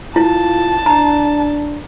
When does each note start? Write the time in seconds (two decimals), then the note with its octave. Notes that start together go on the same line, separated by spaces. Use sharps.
0.16 E4 F4 A5
0.86 D4 A#5